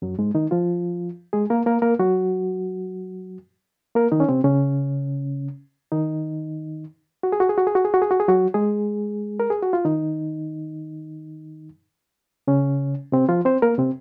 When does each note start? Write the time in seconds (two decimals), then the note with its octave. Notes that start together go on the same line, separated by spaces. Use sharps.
0.02 F#2 F#3
0.19 G#2 G#3
0.35 D#3 D#4
0.51 F3 F4
1.33 G#3 G#4
1.50 A#3 A#4
1.66 A#3 A#4
1.82 A#3 A#4
2.00 F#3 F#4
3.95 A#3 A#4
4.12 D#3 D#4
4.20 C#4
4.29 C3 C4
4.44 C#3 C#4
5.92 D#3 D#4
7.23 F#4
7.32 G#4
7.40 F#4
7.49 G#4
7.58 F#4
7.67 G#4
7.75 F#4
7.85 G#4
7.94 F#4
8.02 G#4
8.11 F#4
8.20 G#4
8.28 F#3 F#4
8.54 G#3 G#4
9.40 A#4
9.50 G#4
9.62 F#4
9.73 F4
9.85 D#3 D#4
12.48 C#3 C#4
13.12 C3 C4
13.29 F3 F4
13.45 C4 C5
13.62 A#3 A#4
13.78 C3 C4